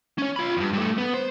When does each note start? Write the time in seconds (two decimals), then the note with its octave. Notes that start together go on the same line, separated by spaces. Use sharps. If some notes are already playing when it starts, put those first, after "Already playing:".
0.18 C#4 C#5
0.36 F4 B5
0.57 E2 G2
0.73 G2 A3
0.98 B3
1.14 C5